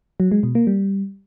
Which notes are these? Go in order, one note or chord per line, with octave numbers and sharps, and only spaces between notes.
F#3
G#3
B2
A#3
G3